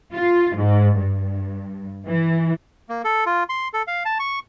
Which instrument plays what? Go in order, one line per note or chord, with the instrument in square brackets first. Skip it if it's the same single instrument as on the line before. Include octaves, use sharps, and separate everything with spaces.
[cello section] F4
G#2
G2
E3
[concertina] A#3
A4
F4
C6
A4
F5
A5
C#6